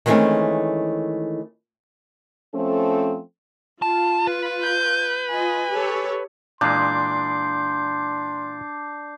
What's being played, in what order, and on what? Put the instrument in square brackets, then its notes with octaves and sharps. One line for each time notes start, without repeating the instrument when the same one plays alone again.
[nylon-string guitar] D#3 E3 G#3 A3 C4 C#4
[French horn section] F3 A3 C4 C#4 A4
[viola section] F4 [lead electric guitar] A5
[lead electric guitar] B4
[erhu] G6
[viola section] F4 D#5 [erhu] G#5
[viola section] G4 A4 C#5
[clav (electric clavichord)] A#2 E3 G#3 [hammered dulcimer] D4 [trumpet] C6 [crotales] G6 C7